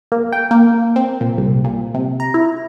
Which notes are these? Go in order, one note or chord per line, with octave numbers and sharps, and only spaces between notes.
A#3
G5
A#3
C4
A#2
C2
A#2
C3
A#5
E4